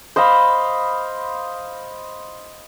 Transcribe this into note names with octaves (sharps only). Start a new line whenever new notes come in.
C5 D#5 F5 B5